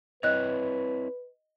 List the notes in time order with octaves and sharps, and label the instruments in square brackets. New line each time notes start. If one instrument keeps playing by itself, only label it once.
[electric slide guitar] C4 E4 C#5 [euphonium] B4 [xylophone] D#5 F#6